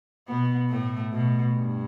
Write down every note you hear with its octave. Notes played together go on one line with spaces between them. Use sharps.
B2 B3
A2 A3
B2
G2